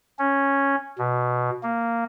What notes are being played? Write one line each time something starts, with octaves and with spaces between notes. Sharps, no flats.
C#4
B2
A#3